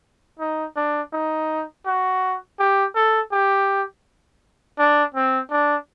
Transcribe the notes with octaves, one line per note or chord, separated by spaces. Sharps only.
D#4
D4
D#4
F#4
G4
A4
G4
D4
C4
D4